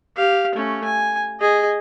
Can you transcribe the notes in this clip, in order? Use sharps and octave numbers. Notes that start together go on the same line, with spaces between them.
G4 F5
A3 C#4
G#5
G#4 D#5